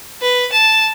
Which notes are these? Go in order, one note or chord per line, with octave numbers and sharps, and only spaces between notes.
B4
A5